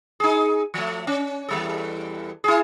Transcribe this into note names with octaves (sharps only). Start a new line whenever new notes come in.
D#4 G#4
F3 A3
C#4
E2 G3 A4
E4 G#4